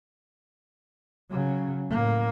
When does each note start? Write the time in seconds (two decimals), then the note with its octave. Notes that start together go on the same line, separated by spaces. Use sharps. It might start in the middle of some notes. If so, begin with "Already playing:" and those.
1.31 C#3 F#3
1.91 A2 A#3